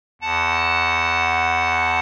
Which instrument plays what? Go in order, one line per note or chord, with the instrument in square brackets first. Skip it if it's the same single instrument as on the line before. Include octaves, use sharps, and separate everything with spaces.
[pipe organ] E2 F#5 A5